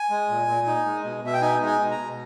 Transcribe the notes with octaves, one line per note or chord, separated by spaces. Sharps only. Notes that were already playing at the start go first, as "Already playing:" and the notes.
Already playing: G#5
G#3
A#2
A#2
D#4
G#3
B2
B2 E5
G5
D#4 G#5
G#3
G#5
B2
A#5
B2